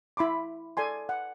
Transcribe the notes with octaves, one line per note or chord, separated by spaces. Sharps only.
E4 B5 C6 D6
A4 D5 G#5 C6
F#5